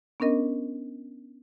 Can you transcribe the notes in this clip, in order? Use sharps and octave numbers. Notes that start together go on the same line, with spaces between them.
B3 C#4 D4 A#4 D#5